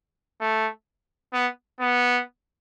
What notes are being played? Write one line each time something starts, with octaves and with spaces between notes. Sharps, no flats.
A3
B3
B3